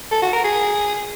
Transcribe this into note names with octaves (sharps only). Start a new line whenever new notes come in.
A4
F#4
A#4
G#4